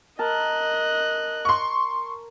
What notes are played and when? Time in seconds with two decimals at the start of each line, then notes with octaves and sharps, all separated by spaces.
0.19 A#4 D#5 A5 F#6
1.45 C6 C#6